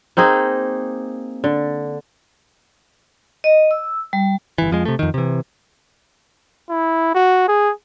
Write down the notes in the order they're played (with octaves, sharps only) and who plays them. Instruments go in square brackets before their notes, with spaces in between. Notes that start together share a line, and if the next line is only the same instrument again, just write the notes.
[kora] A#3 C4 D#4 G#4
D3
[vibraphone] D#5
E6
G3
[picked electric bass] G1 E3
F2 F3 G#3
C3 A3
F2 D#3
C3 E3
[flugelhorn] E4
F#4
G#4